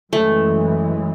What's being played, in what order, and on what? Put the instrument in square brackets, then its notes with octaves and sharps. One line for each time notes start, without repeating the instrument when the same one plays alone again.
[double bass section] F#2 E3 G#3 [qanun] A3